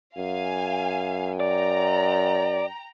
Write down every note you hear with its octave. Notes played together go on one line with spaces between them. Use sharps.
F#2 F5 G#5
D5 G5 A#5